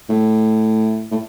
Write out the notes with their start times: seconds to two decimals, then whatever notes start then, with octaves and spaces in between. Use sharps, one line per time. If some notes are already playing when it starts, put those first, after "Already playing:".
0.09 A2
1.11 A2